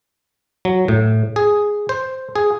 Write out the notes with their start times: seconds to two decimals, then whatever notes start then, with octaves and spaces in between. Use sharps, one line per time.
0.65 F#3
0.88 A2
1.36 G#4
1.89 C5
2.36 G#4